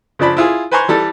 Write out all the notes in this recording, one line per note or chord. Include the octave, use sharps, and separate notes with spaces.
C#3 F3 D4 B5
E4 F4 G#4
B4 C5 G#5 A#5 C6 C#6
E3 G3 A4